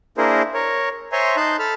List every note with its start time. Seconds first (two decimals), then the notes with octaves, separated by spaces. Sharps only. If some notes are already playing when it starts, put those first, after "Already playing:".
0.18 A#3 D4 E4 G#4 A#4 C5
0.54 A#4 C#5
1.12 C5 C#5 E5 G#5 A#5 C6
1.37 D#4 A5 C6 F#6 G6
1.59 A4 A5 B5 F6